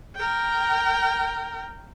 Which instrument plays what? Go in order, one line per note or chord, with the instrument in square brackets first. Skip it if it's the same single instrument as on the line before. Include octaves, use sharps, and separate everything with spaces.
[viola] A#4 G5